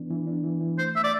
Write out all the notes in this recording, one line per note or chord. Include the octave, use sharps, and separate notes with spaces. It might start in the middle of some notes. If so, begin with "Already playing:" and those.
Already playing: E3 B3 D4
E3
D4
E3
E3
A3 C5
A3 E5
D5